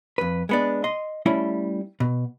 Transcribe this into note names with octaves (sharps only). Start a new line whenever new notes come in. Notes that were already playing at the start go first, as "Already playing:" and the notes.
F2 B4
G#3 B3 D4
D#5 C6
G3 A3 C#4 E4
B2